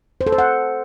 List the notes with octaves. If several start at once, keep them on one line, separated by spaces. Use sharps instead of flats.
C5
A4
C5
F#5